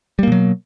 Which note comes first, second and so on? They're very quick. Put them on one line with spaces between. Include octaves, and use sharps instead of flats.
G3 A#3 B2 F#3